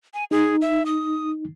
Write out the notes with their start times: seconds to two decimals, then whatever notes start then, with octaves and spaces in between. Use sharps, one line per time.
0.14 G#5
0.31 D#4 G#4
0.61 E5
0.86 D#6